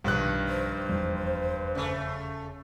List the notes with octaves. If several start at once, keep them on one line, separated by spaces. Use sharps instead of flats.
B1 G2 D#3 F3 F#6
C5
F1 E2 G3
C#3 A3